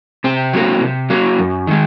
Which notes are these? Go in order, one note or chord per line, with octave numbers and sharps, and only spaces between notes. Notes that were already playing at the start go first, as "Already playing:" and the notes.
C3 C4
F#3 A#3
C3
F#3 A#3
F#2
D#3 G#3